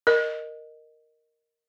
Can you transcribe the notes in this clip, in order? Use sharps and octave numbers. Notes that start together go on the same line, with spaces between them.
A#4 D#5